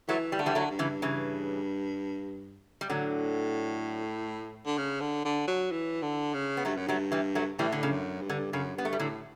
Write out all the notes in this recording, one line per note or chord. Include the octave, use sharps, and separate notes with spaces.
E3 F#3 A3
G3
D3 A3
E3 G3
F#3 A3
G2
C#3 E3
C#3 E3
G3
A2 D3 F#3
D3
C#3
D3
D3
F#3
E3
D3
C#3
B3
G2 F#3 A3
F#2
G2 F#3 A3
E3 G3
F#3 A3
A2 E3 G3
D3
C#3
F#2
G2
D3
F#2 C#3
G2 B3
A3
G3
A2 D3 F#3